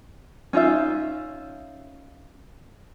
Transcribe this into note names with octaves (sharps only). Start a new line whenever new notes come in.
C#4 D#4 F4 E5